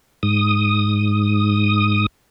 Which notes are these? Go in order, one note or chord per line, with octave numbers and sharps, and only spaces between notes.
G#2 D#6